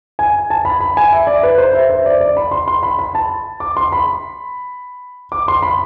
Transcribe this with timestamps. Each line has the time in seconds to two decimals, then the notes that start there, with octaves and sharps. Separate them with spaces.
0.19 G#5
0.50 A5
0.65 B5
0.81 B5
0.97 G#5
1.13 E5
1.27 D5
1.43 B4
1.58 C5
1.74 E5
1.90 C5
2.06 D5
2.21 D5
2.37 B5
2.51 C6
2.68 C6
2.83 B5
2.99 B5
3.15 A5
3.60 D6
3.77 C6
3.92 B5
5.32 D6
5.48 C6
5.63 B5